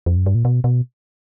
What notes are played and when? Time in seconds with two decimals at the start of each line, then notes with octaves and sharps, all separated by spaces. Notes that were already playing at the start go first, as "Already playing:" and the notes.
0.06 F2
0.17 F#2
0.26 G2
0.35 A#2
0.45 B2
0.64 B2